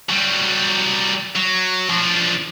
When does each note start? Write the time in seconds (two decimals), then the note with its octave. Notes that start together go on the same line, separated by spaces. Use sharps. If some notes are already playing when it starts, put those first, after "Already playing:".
0.10 F#3 G3
1.35 F#3
1.89 F3 D4